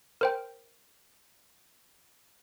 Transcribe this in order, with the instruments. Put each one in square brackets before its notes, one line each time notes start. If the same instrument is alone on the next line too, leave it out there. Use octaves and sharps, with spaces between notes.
[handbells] A#4 C5 G5